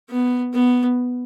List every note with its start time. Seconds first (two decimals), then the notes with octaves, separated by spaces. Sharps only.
0.10 B3
0.54 B3